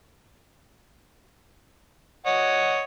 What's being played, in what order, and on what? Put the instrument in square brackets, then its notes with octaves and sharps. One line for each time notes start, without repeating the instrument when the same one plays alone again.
[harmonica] C#5 D#5 F#5